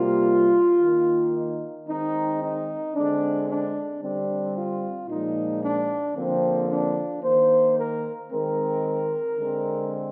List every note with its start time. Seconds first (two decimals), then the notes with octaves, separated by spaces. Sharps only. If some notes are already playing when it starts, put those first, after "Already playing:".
Already playing: C3 G3 A#3 F4
0.80 D#3 A#3
1.34 D#4
1.87 D#3 G#3 C4 D#4
2.41 D#4
2.95 D3 G#3 C4 D4
3.48 D4
4.02 D3 G3 C4 D4
4.56 F4
5.08 A#2 F3 G#3 D#4
5.63 D4
6.16 D3 F3 A#3 C4
6.69 D4
7.23 D#3 A#3 C5
7.77 A#4
8.30 D#3 G#3 C4 A#4
9.38 D3 G#3 C4